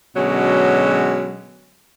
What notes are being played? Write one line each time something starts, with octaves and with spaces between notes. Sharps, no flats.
B2 D3 F#3 G#3 C#4